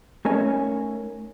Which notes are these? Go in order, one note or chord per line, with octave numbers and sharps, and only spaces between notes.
A3 C#4 D#4 A#4 C#5 G#5